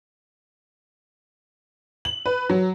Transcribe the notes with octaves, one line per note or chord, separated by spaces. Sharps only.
F#7
B4
F#3